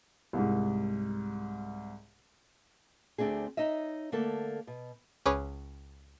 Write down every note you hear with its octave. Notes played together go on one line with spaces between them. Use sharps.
C2 G#2
D2 A3 C4 D4 G#4
D#4 C#5 D#5 E5
D3 A3 A#3 A4
B2
C#2 C#4 G#4 B4 C#5 D6